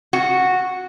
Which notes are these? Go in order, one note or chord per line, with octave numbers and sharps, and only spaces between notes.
F#4